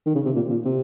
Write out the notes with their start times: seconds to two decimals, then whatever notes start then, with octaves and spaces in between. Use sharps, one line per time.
0.06 D#3
0.15 C#3
0.25 C3
0.36 A#2
0.50 A#2
0.65 C3